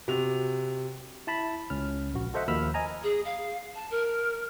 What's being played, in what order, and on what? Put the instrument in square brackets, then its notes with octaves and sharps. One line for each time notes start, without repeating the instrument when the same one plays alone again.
[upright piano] C3 F#4 F7
[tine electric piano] E4 A5 B5
C#2 C#4 F6
A#1 F#4
F#4 A4 C5 D#5 E5 F#5
D#2 F3 A#3 B5 E6 F6
D#5 G#5 A#5
[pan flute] G#4
F5
A5
A#4